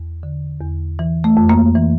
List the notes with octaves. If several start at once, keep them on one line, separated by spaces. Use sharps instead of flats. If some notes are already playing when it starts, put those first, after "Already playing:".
Already playing: E2
D3
E2
E3
A3
F2
A#3
E3